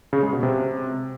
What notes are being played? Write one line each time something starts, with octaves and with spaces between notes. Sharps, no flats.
C#3
G#3
B2
C3